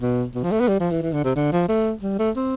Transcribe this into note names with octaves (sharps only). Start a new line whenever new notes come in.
B2
B2
F3
A3
B3
G3
F3
E3
E3
D3
C3
D3
F3
A3
G3
A3
C4